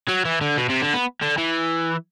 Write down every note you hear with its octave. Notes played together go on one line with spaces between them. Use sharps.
F#3
E3
D3
B2
C3
D3
B3
D3
E3